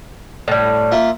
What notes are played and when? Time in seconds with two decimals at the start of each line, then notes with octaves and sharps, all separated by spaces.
0.48 A2 G3
0.91 A#3 F4 E5